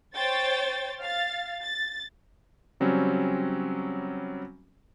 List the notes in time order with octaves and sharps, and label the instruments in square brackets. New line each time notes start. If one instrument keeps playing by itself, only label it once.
[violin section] C5 C#5 G5 A6
F5 A6
A6
[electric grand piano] C#3 F#3 G3 C4 C#4